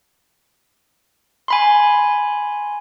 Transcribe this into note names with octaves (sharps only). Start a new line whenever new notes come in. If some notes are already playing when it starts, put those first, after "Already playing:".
G#5 B5 C6